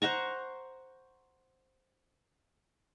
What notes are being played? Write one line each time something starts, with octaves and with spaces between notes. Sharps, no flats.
C5 F#5 A#5 C#6